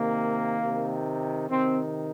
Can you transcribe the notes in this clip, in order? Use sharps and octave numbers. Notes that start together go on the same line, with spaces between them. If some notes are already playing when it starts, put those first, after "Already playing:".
Already playing: C3 D#3 A#3
C3 D#3
C3 D#3 C4